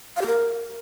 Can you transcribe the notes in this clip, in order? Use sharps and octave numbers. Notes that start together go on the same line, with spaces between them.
F5
G4
A#4